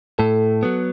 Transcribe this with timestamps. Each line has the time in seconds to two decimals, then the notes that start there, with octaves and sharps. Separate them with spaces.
0.19 A2 A4
0.63 F#3 B3